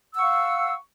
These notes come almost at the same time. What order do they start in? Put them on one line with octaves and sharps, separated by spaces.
E6 F#5 C#6 F5